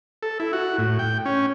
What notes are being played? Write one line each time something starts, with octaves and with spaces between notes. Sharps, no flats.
A4
E4
F#4
A2
G5
C#4